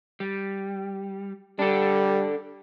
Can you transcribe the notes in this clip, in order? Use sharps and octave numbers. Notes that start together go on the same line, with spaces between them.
G3
G3 D4 A4